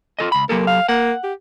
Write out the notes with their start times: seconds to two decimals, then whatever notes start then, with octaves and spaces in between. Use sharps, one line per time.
0.19 F4 A4 D#5
0.32 C#2 B5
0.49 F#3 A#3 G4 A4
0.67 F5
0.88 A#3 F#5
1.24 G4